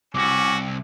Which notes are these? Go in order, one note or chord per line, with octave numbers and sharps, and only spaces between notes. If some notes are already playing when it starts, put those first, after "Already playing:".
C2 C#4 F#4 D6